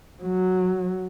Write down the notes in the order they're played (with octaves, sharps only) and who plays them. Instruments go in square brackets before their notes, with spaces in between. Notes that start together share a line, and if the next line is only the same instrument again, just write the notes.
[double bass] F#3